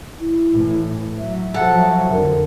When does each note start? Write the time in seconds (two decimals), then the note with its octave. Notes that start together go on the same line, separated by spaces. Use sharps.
0.20 E4
0.53 A2 E3
1.18 F#3 E5
1.54 F3 F#3 A4 F#5 A5
2.12 F2 D3 A#4